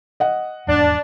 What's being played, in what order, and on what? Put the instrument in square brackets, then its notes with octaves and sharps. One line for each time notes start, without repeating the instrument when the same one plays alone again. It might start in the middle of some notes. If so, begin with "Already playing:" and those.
[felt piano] D#5 F#5
[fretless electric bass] D#1 E2 G#2 [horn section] D4